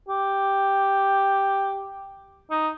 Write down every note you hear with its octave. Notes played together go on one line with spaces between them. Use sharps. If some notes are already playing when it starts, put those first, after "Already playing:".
G4
D#4